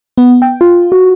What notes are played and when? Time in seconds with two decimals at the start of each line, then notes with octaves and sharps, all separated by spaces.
0.18 B3
0.42 G5
0.61 F4
0.92 F#4